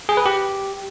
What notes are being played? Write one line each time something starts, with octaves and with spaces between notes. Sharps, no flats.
G#4
B4
G4